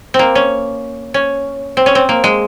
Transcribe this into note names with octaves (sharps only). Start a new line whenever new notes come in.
C4
A#3
C#4
C#4
C4
C#4
C4
A#3
G#3